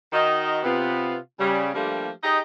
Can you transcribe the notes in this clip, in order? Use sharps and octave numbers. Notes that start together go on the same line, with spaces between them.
D#3 F#4 D#5
C3 B3 F4
C#3 G3
F3 G3 A3 A#3 D4 G4
D#4 G4 G#4 D#5